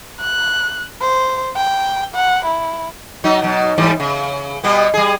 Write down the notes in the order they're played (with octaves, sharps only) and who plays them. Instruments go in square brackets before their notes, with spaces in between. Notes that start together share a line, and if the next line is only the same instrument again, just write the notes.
[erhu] F#6
C5
G5
F#5
E4
[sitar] F#3 D#4
B2 F#3
G#2 E3 G3
C#3
B2 G3 B3
G3 G#4